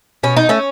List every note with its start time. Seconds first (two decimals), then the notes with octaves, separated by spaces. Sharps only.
0.23 B2 C#4
0.37 D#4
0.49 A3 C#4